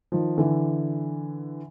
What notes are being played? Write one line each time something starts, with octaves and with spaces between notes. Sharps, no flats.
D#3 F3
D3 E3